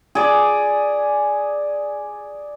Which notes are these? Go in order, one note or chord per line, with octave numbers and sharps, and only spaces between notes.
G#4 D5